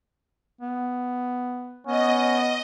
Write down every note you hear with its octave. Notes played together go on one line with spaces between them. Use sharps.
B3
B3 C#4 D#5